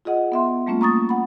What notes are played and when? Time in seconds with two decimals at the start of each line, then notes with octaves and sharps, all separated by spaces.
0.05 F4 G#4 D#5 F#5
0.32 B3 E5 C6
0.67 G3 A3 A#3 C#4 F4
0.81 A#5 C#6 D#6 A6
1.09 F#5 B5